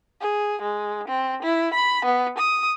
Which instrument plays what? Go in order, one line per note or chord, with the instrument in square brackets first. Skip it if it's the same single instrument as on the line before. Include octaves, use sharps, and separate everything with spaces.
[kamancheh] G#4
G#3
C4
E4
B5
B3
D#6